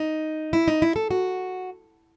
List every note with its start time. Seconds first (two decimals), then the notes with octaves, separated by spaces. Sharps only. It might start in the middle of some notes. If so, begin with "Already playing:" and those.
Already playing: D#4
0.53 E4
0.68 D#4
0.82 E4
0.96 A4
1.11 F#4